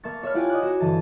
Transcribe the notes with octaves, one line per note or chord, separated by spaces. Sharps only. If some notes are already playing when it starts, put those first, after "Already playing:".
A#3 E5 A5 C#6 A6
C#5 E5 A5 B5 F6
E4 F4 G4 C#5 F#5 G#5
D#5 G#5 D6 F#6
F#4 E7
G1 E3 A5 D#7